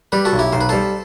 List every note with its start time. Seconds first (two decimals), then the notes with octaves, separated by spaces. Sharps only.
0.12 G3 G4 B4
0.25 F#4 A4
0.32 B1
0.39 E4 G4
0.52 B1 C5
0.61 B4
0.69 G3 A4 C5